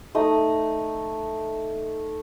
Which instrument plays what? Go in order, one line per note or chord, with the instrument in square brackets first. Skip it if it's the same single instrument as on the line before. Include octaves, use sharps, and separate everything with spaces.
[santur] A3 D#4 D#6